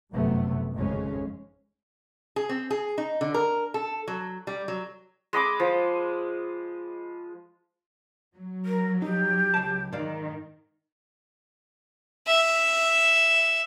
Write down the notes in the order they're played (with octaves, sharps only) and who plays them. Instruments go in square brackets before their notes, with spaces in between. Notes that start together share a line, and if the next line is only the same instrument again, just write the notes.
[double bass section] G1 F#2 C3 A3 B3
G#1 F2 C#3 G#3 C#4
[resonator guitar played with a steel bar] G#4
C4
G#4
D#4
D3
A#4
A4
F#3
G3
F#3
[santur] G#3 D#5 B5 D6
F3
[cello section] F#3
[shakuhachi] A#4
[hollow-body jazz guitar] D#4 [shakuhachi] G4
[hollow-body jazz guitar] C#2 A5
[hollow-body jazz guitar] G#2 D5 F5 [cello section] D#3
[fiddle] E5